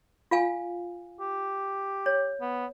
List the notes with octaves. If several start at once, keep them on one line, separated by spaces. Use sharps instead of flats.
F4 F5 G#5
G4
C#5
B3